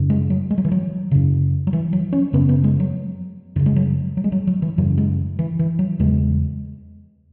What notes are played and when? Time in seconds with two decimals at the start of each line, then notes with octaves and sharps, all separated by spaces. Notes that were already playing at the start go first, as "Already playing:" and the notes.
Already playing: F#2 C#3
0.10 G#3
0.30 F#3
0.51 G#3
0.58 F#3
0.65 E3
0.72 F#3
1.11 F#2 C#3
1.67 F#3
1.73 E3
1.93 F#3
2.13 C#4
2.33 F#2 C#3 B3
2.49 B3
2.64 G#3
2.80 F#3
3.56 F#2 E3
3.59 C#3
3.66 G#3
3.76 F#3
4.17 F#3
4.24 G#3
4.32 F#3
4.47 F#3
4.62 E3
4.78 F#2 C#3 F#3
4.98 G#3
5.39 E3
5.59 E3
5.79 F#3
5.99 E2 C#3 G#3